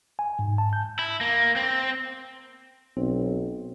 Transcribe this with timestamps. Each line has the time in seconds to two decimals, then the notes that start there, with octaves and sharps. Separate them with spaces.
0.19 G#5
0.39 G#2
0.58 A5
0.73 G6
0.99 E4
1.21 A#3
1.56 C4
2.97 B1 C4